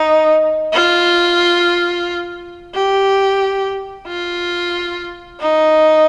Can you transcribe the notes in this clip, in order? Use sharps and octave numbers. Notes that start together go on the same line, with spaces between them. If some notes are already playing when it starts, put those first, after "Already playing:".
Already playing: D#4
F4
G4
F4
D#4